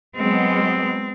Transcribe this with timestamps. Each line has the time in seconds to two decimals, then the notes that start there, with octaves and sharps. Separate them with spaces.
0.16 F#3 G#3 B3 C4